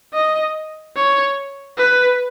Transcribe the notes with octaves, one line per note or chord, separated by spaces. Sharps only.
D#5
C#5
B4